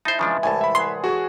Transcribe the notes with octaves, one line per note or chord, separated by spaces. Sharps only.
D#4 E4 C5 A5
C#3 E3 F3 G#3 D4
C2 A2 G#5 A5
E5 B5
G#4 F#5 C6
F#4 G#4 A4 C#5